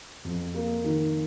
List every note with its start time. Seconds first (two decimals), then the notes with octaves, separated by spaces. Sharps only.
0.25 F2
0.54 A#3
0.84 D#3